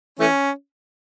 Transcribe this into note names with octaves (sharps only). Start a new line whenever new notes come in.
E3 A3 C#4